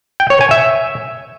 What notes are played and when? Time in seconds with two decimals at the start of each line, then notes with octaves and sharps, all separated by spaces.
0.20 G5
0.30 C#5
0.41 G#5
0.51 E5